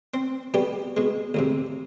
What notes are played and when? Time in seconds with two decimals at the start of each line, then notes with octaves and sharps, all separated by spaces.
0.14 C4
0.54 B2 G3 B3 G4
0.97 B2 G#3
1.34 D2 G#2 C3